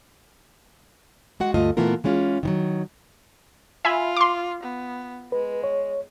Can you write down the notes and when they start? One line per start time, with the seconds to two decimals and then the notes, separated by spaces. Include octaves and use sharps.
1.40 G#3 F#4 F#5
1.54 D2 G2 A3 F4 D#5
1.77 A#2 E3 A3 B3 F4 A#4
2.04 E3 G#3 C#4 F4
2.43 D#3 E3 F#3
3.85 F4 E5 G#5 B5
4.17 C6 D6
4.63 B3
5.32 G#3 B4
5.64 C#5